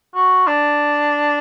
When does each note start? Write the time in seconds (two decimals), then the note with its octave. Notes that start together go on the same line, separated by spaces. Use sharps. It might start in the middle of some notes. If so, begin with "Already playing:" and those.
0.15 F#4
0.47 D4